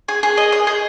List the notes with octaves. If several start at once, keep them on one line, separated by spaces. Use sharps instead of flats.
G#4
G#4
D#5
D#5
G#4